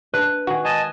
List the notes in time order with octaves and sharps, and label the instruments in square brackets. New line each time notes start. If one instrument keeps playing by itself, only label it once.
[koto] D4 [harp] B4
[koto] D#3 G#4 [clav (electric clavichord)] F#4
[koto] G#3 [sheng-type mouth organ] D#5 G#5 A5